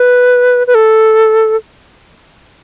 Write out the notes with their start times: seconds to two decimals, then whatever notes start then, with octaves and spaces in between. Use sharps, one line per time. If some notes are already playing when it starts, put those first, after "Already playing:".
Already playing: B4
0.67 B4
0.75 A4